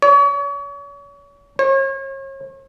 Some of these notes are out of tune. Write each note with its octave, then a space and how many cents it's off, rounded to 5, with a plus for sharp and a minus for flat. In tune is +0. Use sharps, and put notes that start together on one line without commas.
C#5 +35
C#5 -40